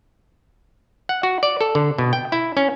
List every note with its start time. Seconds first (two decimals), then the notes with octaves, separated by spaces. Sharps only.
1.09 F#5
1.23 F#4
1.43 D5
1.61 A4
1.75 D3
1.98 B2
2.13 G5
2.32 E4
2.57 C#4